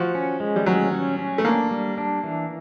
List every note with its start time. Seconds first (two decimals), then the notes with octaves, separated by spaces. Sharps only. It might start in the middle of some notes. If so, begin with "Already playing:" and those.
Already playing: F3 F#4
0.15 C#4
0.40 G#3
0.56 G3
0.66 F#3 C#4
0.92 C#4
1.19 C#4
1.38 A3
1.44 A#3 D4
1.71 G3
1.98 D4
2.24 E3